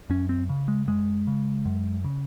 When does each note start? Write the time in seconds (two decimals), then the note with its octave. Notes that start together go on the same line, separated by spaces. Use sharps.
0.10 F#2 C#4
0.29 C4
0.49 C#3
0.68 G#3
0.87 F#2 G#3
1.27 C#3
1.66 F#2
2.04 C#3